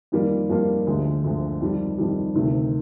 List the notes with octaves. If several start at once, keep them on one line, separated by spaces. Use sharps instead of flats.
F2 D#3 G3 A#3 F4
F2 D#3 G3 A#3 F4
D2 D3 F3 G#3
D2 D3 F3 G#3
F2 D#3 G3
F2 D#3 G3
D2 C3 D#3